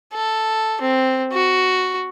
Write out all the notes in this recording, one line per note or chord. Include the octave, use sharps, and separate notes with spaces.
A4
C4
F#4